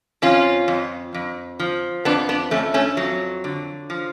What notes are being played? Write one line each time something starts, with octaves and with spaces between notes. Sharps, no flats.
F2 C#4 F4
F2
F2
F3
F2 B3 D4
B3 D4
F2 A3 C#4
A3 C#4
F2 F#3
D3
F3